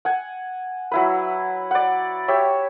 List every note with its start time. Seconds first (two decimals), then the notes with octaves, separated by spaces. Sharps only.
0.05 F#5 G#5
0.92 F#3 E4 B4
1.71 D5 F#5
2.28 G4 C#5 E5